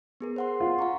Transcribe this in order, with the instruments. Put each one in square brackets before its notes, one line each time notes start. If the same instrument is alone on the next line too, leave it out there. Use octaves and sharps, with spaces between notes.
[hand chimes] B3 G#4 A#4
C5 F#5 C6
[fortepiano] F4
[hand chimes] F5 A#5 C#6